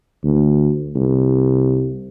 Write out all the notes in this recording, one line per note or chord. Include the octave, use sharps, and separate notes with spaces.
D2
C2